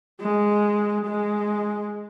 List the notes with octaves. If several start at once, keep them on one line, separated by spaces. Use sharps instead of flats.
G#3
G#3